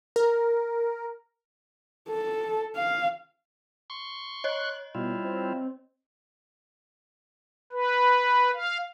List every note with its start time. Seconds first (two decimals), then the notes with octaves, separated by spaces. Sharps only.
0.16 A#4
2.09 A4
2.76 F5
3.90 C6 C#6
4.44 C#5 D#5 F#6
4.95 B2 G3 E4 F4
5.24 C4
7.72 B4
8.53 F5